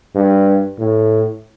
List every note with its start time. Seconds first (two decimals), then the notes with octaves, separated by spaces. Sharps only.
0.15 G2
0.78 A2